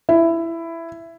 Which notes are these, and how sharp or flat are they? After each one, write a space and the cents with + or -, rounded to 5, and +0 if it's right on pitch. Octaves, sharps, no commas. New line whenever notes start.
E4 +10